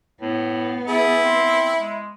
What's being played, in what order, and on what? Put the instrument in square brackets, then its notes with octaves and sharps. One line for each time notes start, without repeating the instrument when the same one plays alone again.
[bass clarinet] A2 [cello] B3
[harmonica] E4 [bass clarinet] G#4
[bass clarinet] C4
G#3